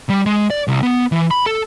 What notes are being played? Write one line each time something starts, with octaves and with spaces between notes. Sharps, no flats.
G3
G#3
D5
C2
B3
E3
B5
A4